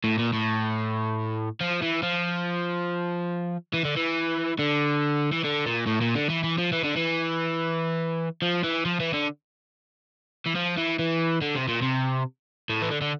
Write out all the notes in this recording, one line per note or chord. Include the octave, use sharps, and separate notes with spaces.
A2
A#2
A2
F3
E3
F3
E3
D3
E3
D3
E3
D3
A#2
A2
A#2
D3
E3
E3
F3
E3
D3
E3
F3
E3
F3
E3
D3
E3
F3
E3
E3
D3
C3
A#2
C3
A2
E3
D3
D3